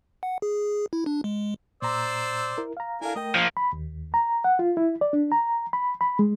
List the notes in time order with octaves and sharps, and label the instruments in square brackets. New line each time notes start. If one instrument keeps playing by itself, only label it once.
[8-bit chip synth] F#5
G#4
E4
D4
G#3
[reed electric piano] A#2 A#5 [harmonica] C5 D5 E6
[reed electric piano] E4 A#4
F5 A#5
[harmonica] D4 A#4 G#5 [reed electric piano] E4 A4 F5
[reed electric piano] A3 A#4 G5 [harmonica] D#5
[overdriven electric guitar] F3 A#3
[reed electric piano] B5
D#2
A#5
F#5
F4
E4
D5
D4
A#5
B5
B5
G#3